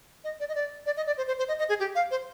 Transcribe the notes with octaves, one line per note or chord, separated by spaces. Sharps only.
D#5
D5
D#5
D5
D5
D#5
D5
C5
C5
C5
D#5
D#5
G#4
G4
F5
C5